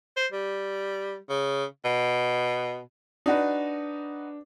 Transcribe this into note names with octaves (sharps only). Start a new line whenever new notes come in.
C5
G3
C#3
B2
D4 D#4 F#4 B4